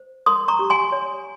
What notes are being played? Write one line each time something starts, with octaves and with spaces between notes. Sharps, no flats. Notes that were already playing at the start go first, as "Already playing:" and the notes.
Already playing: C5
A#4 C6 D#6
A#5 C#6
G4
G#5 C6
C#5